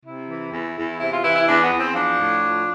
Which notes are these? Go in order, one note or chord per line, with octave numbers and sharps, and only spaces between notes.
C3 E4
E3
E2
E2
C3 E4
F4
E3 E4
E4
E2 D4
B3
E2
C4
F3 D4
A2
F3